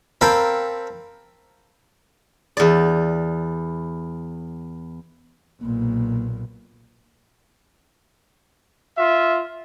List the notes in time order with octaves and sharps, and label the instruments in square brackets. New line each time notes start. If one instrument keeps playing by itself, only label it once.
[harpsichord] C4 A4 A#4 F5 G5 B5
[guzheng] E2 D5
[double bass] B1 A#2 [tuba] A#3
[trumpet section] F4 E5